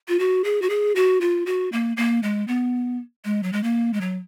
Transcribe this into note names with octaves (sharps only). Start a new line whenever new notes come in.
F4
F#4
G#4
F#4
G#4
F#4
F4
F#4
A#3
A#3
G#3
B3
G#3
F#3
G#3
A#3
G#3
F#3